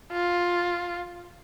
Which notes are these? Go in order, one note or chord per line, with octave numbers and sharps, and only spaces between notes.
F4